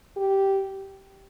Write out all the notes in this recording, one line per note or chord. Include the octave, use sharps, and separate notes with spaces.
G4